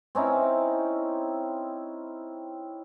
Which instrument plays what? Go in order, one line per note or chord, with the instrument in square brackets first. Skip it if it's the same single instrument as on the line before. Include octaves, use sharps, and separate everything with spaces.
[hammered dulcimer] C4 C#4 D#4 E4